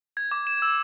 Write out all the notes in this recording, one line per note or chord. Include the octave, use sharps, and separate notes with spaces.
G#6
D6
E7
E6